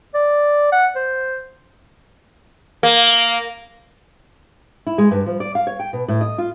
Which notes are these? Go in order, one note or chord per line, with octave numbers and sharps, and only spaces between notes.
D5
F#5
C5
A#3
E4
G#3
G2
F3
D5
F5
C#5
G5
B2
A2
D#5
F4